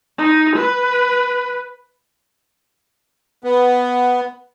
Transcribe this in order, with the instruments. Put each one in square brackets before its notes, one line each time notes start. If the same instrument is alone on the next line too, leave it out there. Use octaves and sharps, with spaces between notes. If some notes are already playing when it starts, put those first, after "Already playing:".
[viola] D#4
B4
[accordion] B3